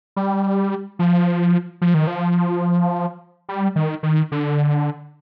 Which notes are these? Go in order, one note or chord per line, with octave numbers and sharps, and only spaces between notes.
G3
F3
F3
D#3
F3
G3
D#3
D#3
D3